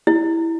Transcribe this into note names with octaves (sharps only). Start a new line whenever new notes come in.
E4